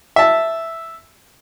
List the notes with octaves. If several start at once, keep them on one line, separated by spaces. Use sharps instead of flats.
E5 A5